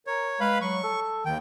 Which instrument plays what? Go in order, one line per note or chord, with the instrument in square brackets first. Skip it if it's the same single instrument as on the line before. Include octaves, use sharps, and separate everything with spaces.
[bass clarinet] A#4 [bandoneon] C#5
[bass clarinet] G#3 [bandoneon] B4 F5 B5
[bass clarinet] F#3 [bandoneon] C#6
[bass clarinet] A4
[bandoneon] D#2 G5 [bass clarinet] D#3